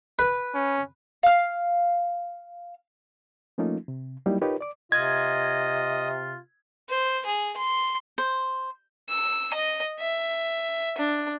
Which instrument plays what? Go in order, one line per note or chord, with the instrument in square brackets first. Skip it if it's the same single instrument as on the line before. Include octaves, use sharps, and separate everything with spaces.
[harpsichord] B4
[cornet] C#4
[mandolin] F5 F6
[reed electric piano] F3 A3 A#3 C#4 D#4 F4
C3
F#3 G3 A#3 D#4 E4
D#4 F4 G4 A#4 B4 C#5
D5 D6
[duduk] C3 [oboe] F4 [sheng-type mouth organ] D#5 [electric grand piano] G#6
[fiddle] C5
G#4
C6
[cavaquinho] C5
[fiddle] E6
D#5
E5
D4